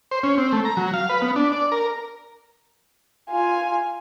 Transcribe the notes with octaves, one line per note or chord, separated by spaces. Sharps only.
C5
C#4
C4
A3
A#5
F#3
F5
B4
B3
D4
D5
A#4
F4 G#5